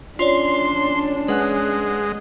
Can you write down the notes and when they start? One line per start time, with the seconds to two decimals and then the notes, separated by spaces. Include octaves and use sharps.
0.19 C#4 D4 F4 C#5 D5 C6
1.28 G#3 B4 F#5 F#6